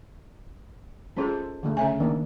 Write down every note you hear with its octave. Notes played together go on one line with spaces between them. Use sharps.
G#3 C#4 F4 G#4 A4 C5
D3 G#3 A3
C#3 C#4 E5 G#5
D#3 A#3 D4